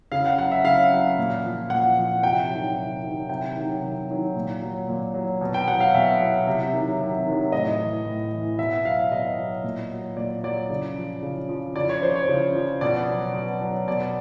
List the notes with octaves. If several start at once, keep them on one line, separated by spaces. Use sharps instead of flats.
C#3 F5
F#5
F#3 F#5
E5
C#3 F5
F#3
A#2
F3
A#2 F#5
F3
C3 G5
D#3 F#3
C3
D#3 F#3
C3 G5
D#3 F#3
C3
D#3 F#3
A#2
F#3
A#2
F#3
B2
G5
F#3 F#5
F5
B2 E5
F#3
C3
D#3 F#3
C3
D#3 F#3
A2 D#5
E3
A2
E3
B2 E5
F#3 F5
B2 D#5
F#3
A#2
F#3
A#2 D5
F#3 D5
C#3
F3
C#3
F3
C#3 D5
C#5
F3 C5
C#5
C#3
F3
B2 D5
F#3
B2
F#3
B2 D5